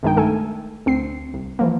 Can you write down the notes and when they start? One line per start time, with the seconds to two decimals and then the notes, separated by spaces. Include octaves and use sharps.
0.03 B1 G2 D#3 G#3 D#4 G5
0.16 A3 A4 G#5
0.86 D2 C4 C7
1.34 C2
1.59 E3 F3 A#3